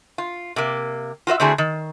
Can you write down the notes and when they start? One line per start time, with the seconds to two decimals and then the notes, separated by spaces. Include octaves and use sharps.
0.18 F4
0.56 C3 A#3
1.27 F4 F#4 C5 E5
1.40 D3 A3 C4 E4 F#4 G#4
1.58 D#3